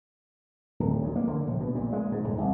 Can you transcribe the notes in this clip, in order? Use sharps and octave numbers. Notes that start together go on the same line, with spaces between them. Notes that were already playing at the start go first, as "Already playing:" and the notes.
D1
D2
A#3
D3
A#1
B2
A#2
G#3
G#2
D#1
C2